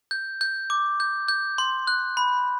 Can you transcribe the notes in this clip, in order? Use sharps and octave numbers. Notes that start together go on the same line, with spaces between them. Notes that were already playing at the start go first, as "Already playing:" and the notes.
G6
G6
D6
G6
G6
C6
F#6
B5